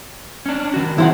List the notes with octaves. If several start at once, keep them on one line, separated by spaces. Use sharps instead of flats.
C#4 D4
D#3 F#4
E3 E4 G4 G#4 C5 F#5